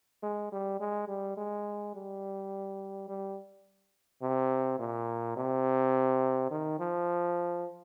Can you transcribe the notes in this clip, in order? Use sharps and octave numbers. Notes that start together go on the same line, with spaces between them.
G#3
G3
G#3
G3
G#3
G3
G3
C3
A#2
C3
D#3
F3